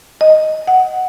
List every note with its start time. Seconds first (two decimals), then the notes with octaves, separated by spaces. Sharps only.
0.21 D#5
0.67 F#5